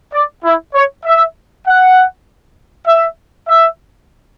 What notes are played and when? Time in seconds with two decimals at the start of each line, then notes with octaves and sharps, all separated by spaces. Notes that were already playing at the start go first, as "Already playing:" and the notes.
0.13 D5
0.44 E4
0.74 C#5
1.04 E5
1.66 F#5
2.86 E5
3.48 E5